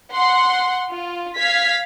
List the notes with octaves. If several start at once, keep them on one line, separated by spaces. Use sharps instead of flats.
F#5 C6
F4
F5 G#6 B6